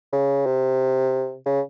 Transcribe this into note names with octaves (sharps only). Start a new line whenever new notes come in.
C#3
C3
C#3